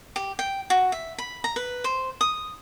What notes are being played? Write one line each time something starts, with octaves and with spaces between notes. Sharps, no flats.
G4
G5
F#4
E5
B5
A#5
B4
C5
D#6